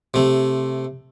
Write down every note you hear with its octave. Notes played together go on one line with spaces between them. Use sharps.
C3 A3